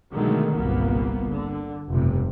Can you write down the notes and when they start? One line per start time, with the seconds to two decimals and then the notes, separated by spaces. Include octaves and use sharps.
0.13 B2 D3 D#3 F#3 G#3 A3
0.55 G1 C2 A#2 A#3 B3
1.28 D3
1.91 F1 B1 G2 C3